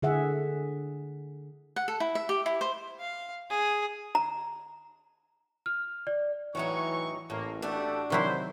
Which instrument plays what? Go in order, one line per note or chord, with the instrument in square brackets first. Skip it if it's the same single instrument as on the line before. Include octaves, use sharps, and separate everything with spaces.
[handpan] D3 G#4 E5 F#5
[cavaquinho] F#5
A4
E4
E5
G4
E4
C5
[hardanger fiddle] F5
G#4
[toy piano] A#5
[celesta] F6
D5
[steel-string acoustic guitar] A2 F#3 D#4 [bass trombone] E3 [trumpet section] C#6
[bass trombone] A1 [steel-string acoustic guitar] A2 [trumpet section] A#3
[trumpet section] A3 G4 A4 [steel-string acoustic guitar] D4 F#4
[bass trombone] C3 [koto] D#3 F#3 E4 [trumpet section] C5